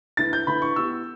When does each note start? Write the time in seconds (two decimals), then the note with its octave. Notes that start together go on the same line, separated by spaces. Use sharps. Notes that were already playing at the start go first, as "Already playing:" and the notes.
0.17 D3 A3 E4 B4 A6
0.33 G6
0.47 D3 A3 E4 B4 B5
0.62 C#6
0.76 B3 E4 G4 E6